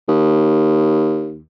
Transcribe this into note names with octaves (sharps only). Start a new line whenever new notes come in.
D#2